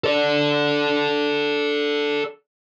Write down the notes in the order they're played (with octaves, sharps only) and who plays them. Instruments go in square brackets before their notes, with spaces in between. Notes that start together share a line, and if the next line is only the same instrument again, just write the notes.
[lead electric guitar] A4 D5